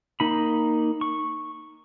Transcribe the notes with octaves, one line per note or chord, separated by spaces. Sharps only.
A#3 D#4 B5
C#6